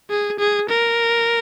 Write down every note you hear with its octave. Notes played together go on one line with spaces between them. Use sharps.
G#4
G#4
A#4